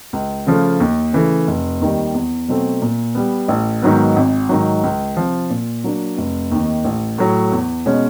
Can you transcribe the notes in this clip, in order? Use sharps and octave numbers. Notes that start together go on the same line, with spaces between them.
C#2
C#3 F3 A3
D#2
C#3 E3 A3
F1
D#2 D#3 G3
E2
B2 F#3 A3 C4
A#2
G3 B3
A1
G#2 D#3 F#3 B3
G#1
G#2 D#3 F#3
C#2
C3 F3
A#2
F#3 A#3 D4
F1
D#2 D#3
A1
A2 F#3
E2
B2 G#3 C#4